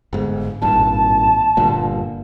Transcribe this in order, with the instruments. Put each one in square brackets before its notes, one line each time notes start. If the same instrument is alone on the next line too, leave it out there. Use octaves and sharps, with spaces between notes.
[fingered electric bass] G1 G#2
[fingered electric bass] G#1 G2 A#2 [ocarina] A5
[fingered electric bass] G1 G2 A#2